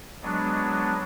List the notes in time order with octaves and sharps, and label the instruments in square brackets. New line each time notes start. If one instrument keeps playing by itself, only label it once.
[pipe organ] F#3 G#3 B3 D4